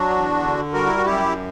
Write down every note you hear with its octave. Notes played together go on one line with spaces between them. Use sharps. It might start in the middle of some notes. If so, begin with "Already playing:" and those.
Already playing: F#3 D4 F#4
E2
D3
G3 F#4 A#4
E4
F#4
F#2 E4 G4